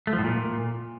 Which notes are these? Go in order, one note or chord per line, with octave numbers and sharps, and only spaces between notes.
A3
F3
A2
A#2